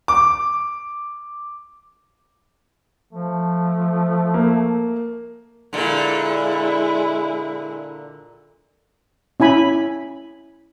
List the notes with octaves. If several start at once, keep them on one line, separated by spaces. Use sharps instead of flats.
D6
F3 A3
A#3
A#2 D3 G#3 E4
C#4 E4 G#5 B5